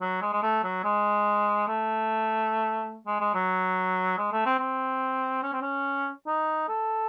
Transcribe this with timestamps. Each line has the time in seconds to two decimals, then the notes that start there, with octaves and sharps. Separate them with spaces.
0.01 F#3
0.22 G#3
0.32 G#3
0.43 A3
0.64 F#3
0.84 G#3
1.68 A3
3.07 G#3
3.21 G#3
3.34 F#3
4.18 G#3
4.32 A3
4.46 C4
4.59 C4
5.43 C#4
5.53 C4
5.61 C#4
6.27 D#4
6.68 A4